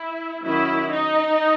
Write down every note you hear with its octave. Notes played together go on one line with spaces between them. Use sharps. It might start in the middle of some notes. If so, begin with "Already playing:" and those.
Already playing: E4
D#3 F#3 C#4 E4
D#4